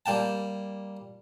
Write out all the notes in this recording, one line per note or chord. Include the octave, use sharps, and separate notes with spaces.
G3 A#3 G5 A5